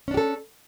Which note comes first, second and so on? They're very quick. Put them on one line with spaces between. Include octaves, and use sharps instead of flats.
C#4 D4 G4 A4